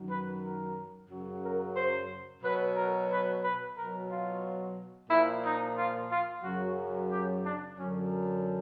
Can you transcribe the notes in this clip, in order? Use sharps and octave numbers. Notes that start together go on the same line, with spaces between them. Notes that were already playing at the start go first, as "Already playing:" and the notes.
Already playing: F#2 D#3 F#3
B4
A#4
F#2 C#3 F#3
A#4
C5
B2 F#3 B4
A#4
B4
B4
B2 F#3 A#4
F4
A#2 F3 E4
D#4
F4
F4
F#2 C#3 F#3 F#4
G4
D4
F#2 D3 F#3 C#4